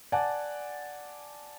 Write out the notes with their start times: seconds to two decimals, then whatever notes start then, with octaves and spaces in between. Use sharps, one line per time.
0.12 D5 F#5 G#5 A5